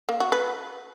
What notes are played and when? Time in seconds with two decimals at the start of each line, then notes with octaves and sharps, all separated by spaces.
0.09 A#3
0.20 F#4
0.32 B4